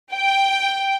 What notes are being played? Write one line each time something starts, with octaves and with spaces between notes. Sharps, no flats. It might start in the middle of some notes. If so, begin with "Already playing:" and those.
G5